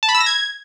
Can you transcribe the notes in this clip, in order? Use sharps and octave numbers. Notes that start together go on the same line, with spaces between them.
A5
B5
E6
A#6
G#6